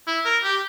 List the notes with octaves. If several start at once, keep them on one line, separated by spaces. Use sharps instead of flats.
E4
A#4
G4